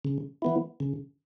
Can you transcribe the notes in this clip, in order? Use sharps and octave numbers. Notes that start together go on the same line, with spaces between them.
C#3
E3 B3 E4
C#3